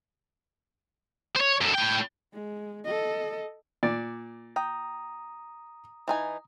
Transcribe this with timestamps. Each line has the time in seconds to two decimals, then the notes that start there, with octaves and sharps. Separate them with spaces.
1.36 C5 C#5
1.61 F#2 A4
1.75 A2 G5
2.33 G#3
2.85 A4 D#5
3.83 A#2 D5
4.56 G5 A#5 D#6
6.08 E3 D#4 G#5